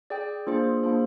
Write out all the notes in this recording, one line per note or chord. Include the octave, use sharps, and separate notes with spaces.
G#4 D5 G5
A#3 D4 F4 G#4 C5
A#3 D4 F4 G#4 C5